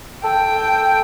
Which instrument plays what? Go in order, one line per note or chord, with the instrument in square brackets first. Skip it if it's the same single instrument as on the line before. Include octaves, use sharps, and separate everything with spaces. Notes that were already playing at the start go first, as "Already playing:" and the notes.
[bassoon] A4 [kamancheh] G5